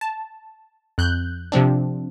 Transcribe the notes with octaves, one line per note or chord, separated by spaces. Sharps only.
A5
F2 F#6 G6
C3 F3 C4 D4